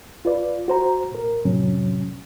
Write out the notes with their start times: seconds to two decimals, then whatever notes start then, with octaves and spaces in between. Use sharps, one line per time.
0.25 F4 B4 D5
0.68 F#4 C5 A#5
1.12 A#2 A#4
1.45 F2 A2 C3 F#3 C#4